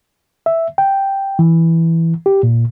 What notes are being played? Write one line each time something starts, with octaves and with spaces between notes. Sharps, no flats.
E5
G5
E3
G4
A#2